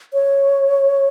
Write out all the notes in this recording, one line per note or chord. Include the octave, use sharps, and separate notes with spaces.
C#5